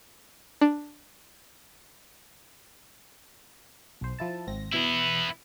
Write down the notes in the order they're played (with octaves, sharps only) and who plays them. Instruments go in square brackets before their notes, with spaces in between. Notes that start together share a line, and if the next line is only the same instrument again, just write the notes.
[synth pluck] D4
[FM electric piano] B1 C5
F3 E4 A5
G#1 C4 A#6
[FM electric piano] B2 E3 [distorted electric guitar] B3 E4